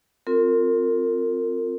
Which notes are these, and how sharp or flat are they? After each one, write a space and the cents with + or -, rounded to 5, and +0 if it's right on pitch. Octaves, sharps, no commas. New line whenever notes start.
C4 +0 F4 +20 A#4 -35